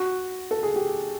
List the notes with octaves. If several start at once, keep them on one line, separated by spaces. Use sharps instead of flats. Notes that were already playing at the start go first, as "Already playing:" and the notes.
Already playing: F#4
A4
G#4
G4